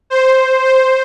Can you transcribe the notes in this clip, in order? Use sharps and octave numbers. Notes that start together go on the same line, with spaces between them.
C5
C5